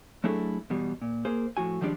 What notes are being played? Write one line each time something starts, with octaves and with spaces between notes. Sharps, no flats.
F#3 A3 D4 E4 G#4 A4
E2 B2 G3
A#2
A#3 G#4 C5
A2 F3 F#4 G#5
D#3 F3 G3 G#3 D4 D5